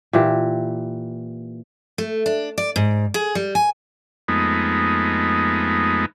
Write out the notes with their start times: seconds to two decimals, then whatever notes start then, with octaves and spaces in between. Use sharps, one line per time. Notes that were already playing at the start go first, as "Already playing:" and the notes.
0.13 A#2 E3 G4
1.98 A3
2.26 D4
2.58 D5
2.76 G#2
3.14 G#4
3.35 G3
3.55 G#5
4.28 F2 G#3 A3 B3 D#4